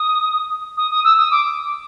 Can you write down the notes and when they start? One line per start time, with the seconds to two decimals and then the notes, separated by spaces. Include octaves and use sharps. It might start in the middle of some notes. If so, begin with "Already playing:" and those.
Already playing: D#6
0.77 D#6
0.91 D#6
1.04 E6
1.18 D#6
1.31 D6